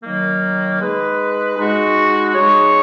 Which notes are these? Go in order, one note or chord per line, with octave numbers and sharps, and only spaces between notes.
D#3 F#3 A#3
G#3 D#4 G#4 B4
G#3 D#4 F#4
G#3 D#4 G#4 C#5